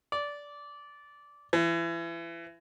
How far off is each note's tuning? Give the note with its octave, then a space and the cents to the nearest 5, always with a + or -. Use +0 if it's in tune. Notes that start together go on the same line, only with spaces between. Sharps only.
D5 -15
E3 +30